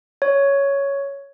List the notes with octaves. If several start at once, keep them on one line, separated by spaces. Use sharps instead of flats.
C#5